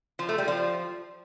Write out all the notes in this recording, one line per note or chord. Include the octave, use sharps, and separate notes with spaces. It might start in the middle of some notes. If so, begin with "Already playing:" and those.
F3
A3
G3
F3